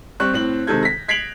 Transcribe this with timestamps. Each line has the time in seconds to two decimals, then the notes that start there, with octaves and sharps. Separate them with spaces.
0.20 G3 C4 C#6 F#6
0.33 A2 C4 F#7
0.67 C3 D#3 G#3 A4 G6 G#6
0.83 A#6 B6
1.08 G#6 B6 C7 D7 F7 F#7